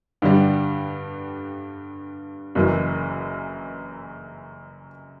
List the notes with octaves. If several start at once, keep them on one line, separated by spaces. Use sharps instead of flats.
G2 D3 G3
F#1 F#2 E3